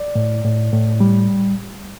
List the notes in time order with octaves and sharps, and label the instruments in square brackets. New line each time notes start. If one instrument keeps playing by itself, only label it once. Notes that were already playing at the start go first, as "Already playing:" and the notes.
Already playing: [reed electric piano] D5
A2
A2
A2
G3